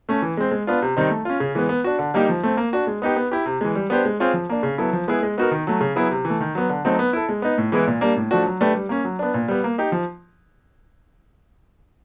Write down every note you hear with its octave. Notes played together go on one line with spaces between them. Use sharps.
A3 C#4
E3
G#3 C4
G#3
B3 D4 F4
C3
D#3 G3 C4 D#4
A3
C#4 F4
C#3
E3 G#3 B3
B3
D4 F#4
D3
G3 A#3 D#4 G4
F3
A3 C4
A#3
D4 F#4
G#3
B3 D#4 G4
B3
E4 G4
C3
E3 G#3
G3
B3 D4 G4 C5
G#3
C4 F4 G#4 C#5
F3
A#3 D4
C#3
F#3 B3 E4 A4
F3
G#3 B3 E4 G#4
G#3
B3 D#4 F#4 A#4
D#3
F#3 A3
C#3
F#3 B3 E4 G#4
C3
E3
A3
D#3
F#3 B3
D3
F#3 A3 C4 D#4
B3
E4 A4
G#3
B3 D#4
A2
E3 G#3 B3 E4
A#2
G3 A#3 D4
A2
F3 A3 D4 F#4
F#3
A3 D4 G4 B4
G3
A#3 C#4
F#3
B3 D4
A#2
G3 B3
A#3
D#4 G4
F3